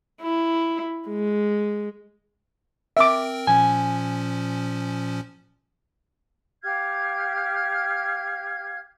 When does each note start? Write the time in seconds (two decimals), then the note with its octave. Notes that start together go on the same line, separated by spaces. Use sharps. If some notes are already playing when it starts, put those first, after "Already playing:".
0.22 E4
1.09 G#3
2.97 C4 A#4 E5 G5 D6
3.47 A#2 F3 C#4 G#5
6.63 G4 F5 F6 G#6